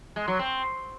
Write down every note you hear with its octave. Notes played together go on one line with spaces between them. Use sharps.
G#3
F#3
C4